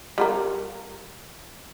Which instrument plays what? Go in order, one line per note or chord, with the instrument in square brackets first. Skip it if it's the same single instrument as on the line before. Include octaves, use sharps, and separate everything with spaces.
[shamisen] G3 F4 A#4